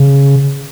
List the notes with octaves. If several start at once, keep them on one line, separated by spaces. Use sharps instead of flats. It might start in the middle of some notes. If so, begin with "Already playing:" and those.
Already playing: C#3